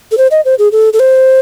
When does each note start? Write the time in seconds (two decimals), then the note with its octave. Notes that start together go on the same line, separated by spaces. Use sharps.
0.12 A4
0.18 C5
0.31 D#5
0.45 C5
0.59 G#4
0.72 A4
0.93 A4
1.00 C5